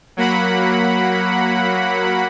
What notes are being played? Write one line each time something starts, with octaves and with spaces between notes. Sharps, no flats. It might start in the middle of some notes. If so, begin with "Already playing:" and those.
F#3 A#3 F#5 B5